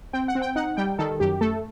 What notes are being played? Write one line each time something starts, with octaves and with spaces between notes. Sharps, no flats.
C4 G5
F#5
C4
G5
D#4 F#5
G3 G5
D#3 A4
F#2 G4
A3 A4